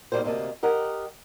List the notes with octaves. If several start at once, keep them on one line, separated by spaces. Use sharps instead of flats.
B2 D#3 F#3 G3 A#3 C5
D2 C3 A#3 D#5 A5
G4 A#4 D#5 F#5